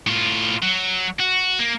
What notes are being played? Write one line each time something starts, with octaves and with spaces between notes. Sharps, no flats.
A2 F4
F#3
F#4
A#3